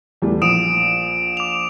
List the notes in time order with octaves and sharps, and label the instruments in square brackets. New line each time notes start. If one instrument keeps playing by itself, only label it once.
[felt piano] E2 G3 A3
[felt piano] A#1 [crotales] D#6 D7 E7
[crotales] D6 F7